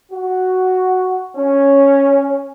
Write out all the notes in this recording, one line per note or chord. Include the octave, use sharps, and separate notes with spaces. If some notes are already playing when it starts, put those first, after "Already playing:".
F#4
C#4